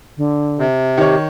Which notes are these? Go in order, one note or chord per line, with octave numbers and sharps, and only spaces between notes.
D3
C3
D#3 G4 C#5